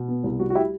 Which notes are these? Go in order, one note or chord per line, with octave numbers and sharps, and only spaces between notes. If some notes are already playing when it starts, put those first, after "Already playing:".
Already playing: B2
B3
C2
G3 F#4
F#4
E4 G4